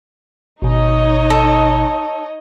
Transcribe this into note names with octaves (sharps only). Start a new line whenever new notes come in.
G#1 B2 D#4 C#5 D#5
A4